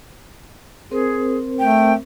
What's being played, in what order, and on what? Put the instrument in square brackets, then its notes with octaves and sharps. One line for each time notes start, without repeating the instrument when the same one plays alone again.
[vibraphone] C4 A#4 C5 [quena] G#4
[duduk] A3 [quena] G5